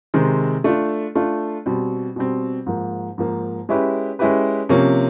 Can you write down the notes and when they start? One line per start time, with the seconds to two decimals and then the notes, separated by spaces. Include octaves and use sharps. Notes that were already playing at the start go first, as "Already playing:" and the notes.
0.14 C3 D#3 G#3 C4
0.64 A3 D4 F4
1.15 A3 D4 F4
1.66 B2 G3 C4
2.16 B2 G3 C4
2.66 G#2 F3 A#3
3.18 G#2 F3 A#3
3.69 G#3 C#4 E4 G4 B4
4.19 G#3 C#4 E4 G4 B4
4.69 C3 F3 A#3 C#4